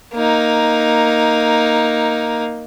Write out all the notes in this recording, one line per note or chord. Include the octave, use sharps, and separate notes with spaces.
A#3 D#4